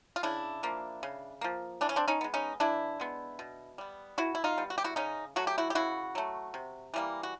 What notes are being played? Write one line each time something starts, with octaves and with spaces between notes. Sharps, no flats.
F4
C#3 D4 E4
F3 A#3
C#3
F3 A#3
E3 D4
C#4
C4 D4
C#4 D#4
G#3 B3
C#4 D#4
E3 D4 E4
G#3 B3
B2
G3 B3
B2 E4 F#4
E4
D#4 F4
G3 B3
F#4
G4
E4 F#4
C#3 C#4 D#4
F#3 A3 F#4
G4
E4 F#4
G4
C#3 E4 F#4
F#3 A3
C3
E3 G3 A#3
F#4